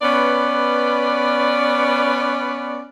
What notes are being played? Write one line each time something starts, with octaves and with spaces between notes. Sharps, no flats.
B3 C#4 B4 D5